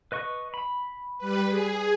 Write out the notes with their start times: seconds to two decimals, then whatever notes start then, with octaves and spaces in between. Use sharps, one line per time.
0.12 B4 D#5 C#6
0.54 B5
1.18 G3 B4
1.47 G#4